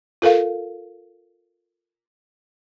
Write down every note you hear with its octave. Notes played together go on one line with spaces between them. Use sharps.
F4 A4 A#4 F5